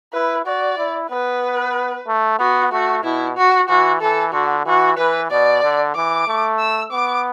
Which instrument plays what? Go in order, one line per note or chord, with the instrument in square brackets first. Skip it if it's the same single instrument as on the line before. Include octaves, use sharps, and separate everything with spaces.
[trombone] E4 [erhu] B4
[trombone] F#4 [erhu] D5
[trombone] E4
[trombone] B3 [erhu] B4
[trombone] A3
[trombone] B3 [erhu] F#4
[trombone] A3 [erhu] F#4
[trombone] B2 [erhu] E4
[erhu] F#4
[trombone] E3 [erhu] F#4
[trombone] E3 [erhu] A4
[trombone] D3 [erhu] F#4
[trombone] E3 [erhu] F#4
[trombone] E3 [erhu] B4
[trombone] B2 [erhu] D5
[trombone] D3
[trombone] E3 [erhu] D6
[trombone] A3
[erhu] E6
[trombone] B3 [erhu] D6